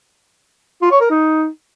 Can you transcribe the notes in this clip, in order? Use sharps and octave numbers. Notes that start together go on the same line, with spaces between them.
F4
C#5
A#4
D#4